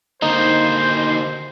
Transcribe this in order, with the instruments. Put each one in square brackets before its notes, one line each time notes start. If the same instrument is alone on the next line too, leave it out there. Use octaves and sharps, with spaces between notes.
[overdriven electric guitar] D3 A#3 [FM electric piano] D#4 [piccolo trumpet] C5